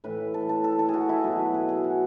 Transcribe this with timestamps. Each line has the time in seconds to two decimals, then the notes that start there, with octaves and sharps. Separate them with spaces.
0.04 A2 E3 B4
0.34 A4
0.49 A4
0.64 A4
0.79 A4
0.89 F#4 G#4
1.09 E4
1.24 B2 F#3 G#4
1.39 B4
1.54 A4
1.69 G#4
1.84 F#4